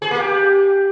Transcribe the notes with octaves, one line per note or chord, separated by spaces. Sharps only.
G#4
A#3
G4